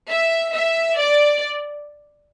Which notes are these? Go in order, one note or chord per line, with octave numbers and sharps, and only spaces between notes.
E5
E5
D5